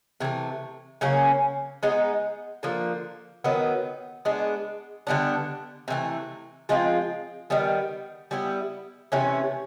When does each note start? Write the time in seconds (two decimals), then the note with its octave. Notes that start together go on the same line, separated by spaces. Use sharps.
0.20 C3 E3 A3
1.01 C#3 F#3 A#3 C#4
1.83 G#3 B3 D#4
2.63 D3 F3 A#3
3.44 D#3 F#3 B3
4.25 G#3 B3 D4
5.07 D3 G3 B3 D4
5.88 C3 E3 A3
6.69 F3 G#3 C4 F4
7.50 D#3 G3 B3
8.31 G3 B3 E4
9.12 C3 E3 A3 C#4